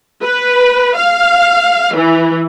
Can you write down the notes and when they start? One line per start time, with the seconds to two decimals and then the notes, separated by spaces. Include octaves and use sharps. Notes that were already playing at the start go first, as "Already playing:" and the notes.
0.22 B4
0.97 F5
1.95 E3